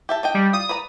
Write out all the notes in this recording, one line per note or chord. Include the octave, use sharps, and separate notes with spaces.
G4 E5 A5
D4 D#5 G5
G3
F4 D#6
B4 D5 A#5